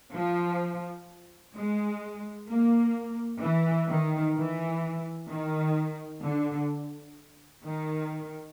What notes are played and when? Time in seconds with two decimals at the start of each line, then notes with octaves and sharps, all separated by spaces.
0.14 F3
1.55 G#3
2.48 A#3
3.42 E3
3.90 D#3
4.36 E3
5.30 D#3
6.24 D3
7.64 D#3